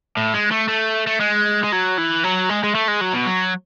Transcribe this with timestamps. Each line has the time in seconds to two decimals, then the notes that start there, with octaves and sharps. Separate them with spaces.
0.17 A2
0.34 G#3
0.51 A3
0.68 A3
1.07 A3
1.20 G#3
1.63 G#3
1.72 F#3
1.97 E3
2.24 F#3
2.49 G#3
2.63 G#3
2.75 A3
2.88 G#3
3.01 F#3
3.14 B2
3.27 F#3